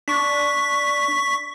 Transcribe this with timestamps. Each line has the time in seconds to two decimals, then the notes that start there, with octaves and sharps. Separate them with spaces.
0.08 D4 C#6 B6